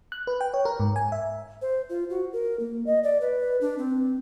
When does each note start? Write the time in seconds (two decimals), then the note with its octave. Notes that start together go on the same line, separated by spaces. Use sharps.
0.12 F#6
0.27 B4
0.41 G5
0.54 C#5
0.65 A#4
0.80 G#2
0.96 G#5
1.12 E5
1.62 C5
1.89 F4
2.10 F#4
2.33 A#4
2.59 A#3
2.86 D#5
3.03 D5
3.21 B4
3.61 D4
3.78 C4